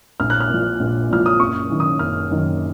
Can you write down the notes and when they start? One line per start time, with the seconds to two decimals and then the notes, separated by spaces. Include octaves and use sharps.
0.20 A#1 F6
0.30 F#6
0.40 F6
0.50 A#2 F3
0.80 A#1
1.10 A#2 F3 F6
1.26 D#6
1.39 F#1 C#6
1.70 F#2 D#3
1.80 D#6
1.99 F#1 F6
2.30 F#2 D#3